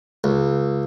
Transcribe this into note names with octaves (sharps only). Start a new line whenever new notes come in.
C#2